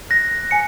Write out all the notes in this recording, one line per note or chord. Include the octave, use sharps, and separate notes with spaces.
F#6 A#6
G#5 C#7